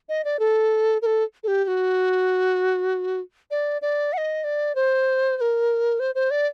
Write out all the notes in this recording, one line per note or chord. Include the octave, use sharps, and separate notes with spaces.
D#5
D5
A4
A#4
A4
A4
G4
G4
F#4
D5
D5
F#5
D#5
D5
C5
C5
A#4
C5
C5
D5